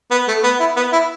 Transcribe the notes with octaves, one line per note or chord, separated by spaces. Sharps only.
B3
A3
B3
E4
B3
E4